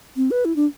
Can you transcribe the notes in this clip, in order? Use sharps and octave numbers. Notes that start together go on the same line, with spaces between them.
C4
B4
E4
D4